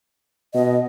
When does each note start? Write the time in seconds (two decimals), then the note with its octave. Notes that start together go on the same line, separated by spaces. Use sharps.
0.54 B2 D#5